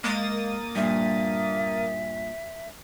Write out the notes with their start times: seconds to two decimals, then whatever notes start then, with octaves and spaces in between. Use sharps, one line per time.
0.04 G#3 A#3 D#6 A6
0.76 G2 A#2 E5